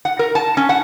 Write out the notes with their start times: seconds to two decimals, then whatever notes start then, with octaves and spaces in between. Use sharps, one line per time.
0.05 F#5
0.19 A#4
0.35 A5
0.57 C#4
0.69 F#5